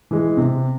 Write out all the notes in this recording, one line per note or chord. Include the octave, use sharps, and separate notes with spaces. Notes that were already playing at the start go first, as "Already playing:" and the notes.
E3 G#3
C3